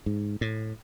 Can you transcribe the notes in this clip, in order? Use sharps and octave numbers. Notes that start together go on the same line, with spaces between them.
G#2
A2